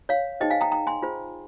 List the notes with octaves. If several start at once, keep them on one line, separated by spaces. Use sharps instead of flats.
C#5 F5
D#4 G#4 C5 D#5 G5
F5 G#5
G5 A#5
G5 A#5
G#5 C6
F4 G#4 C5